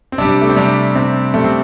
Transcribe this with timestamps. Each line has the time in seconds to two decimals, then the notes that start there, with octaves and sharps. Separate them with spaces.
0.12 C4
0.18 C3 G3 D4
0.41 A3
0.49 C4
0.56 C3 G3 D4
0.95 C3 G3 C4
1.34 C3 G3 A3
1.44 C4